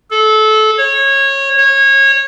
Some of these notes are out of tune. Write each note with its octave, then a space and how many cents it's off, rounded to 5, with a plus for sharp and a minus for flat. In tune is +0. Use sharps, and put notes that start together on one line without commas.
A4 -25
C#5 -20
C#5 -25